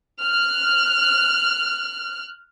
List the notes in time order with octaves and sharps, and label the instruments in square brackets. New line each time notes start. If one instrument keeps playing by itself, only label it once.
[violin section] F6 F#6